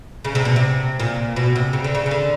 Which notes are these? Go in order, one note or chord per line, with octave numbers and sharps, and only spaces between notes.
C#3
C3
B2
C3
A#2
B2
C3
C#3
D3
C#3
C#3
D3